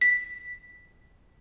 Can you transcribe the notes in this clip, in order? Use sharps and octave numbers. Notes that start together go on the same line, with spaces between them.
B6